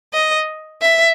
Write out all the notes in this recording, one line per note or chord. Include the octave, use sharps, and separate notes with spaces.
D#5
E5